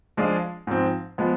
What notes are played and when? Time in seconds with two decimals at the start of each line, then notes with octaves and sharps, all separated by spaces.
0.17 F3 G#3 D4 F4 G#4
0.67 G#2 F3 C4
1.18 F3 G#3 B3